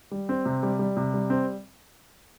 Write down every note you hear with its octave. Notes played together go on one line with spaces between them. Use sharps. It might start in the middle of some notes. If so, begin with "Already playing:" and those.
G3
C4
C3
G3
G3
C3
G3
C4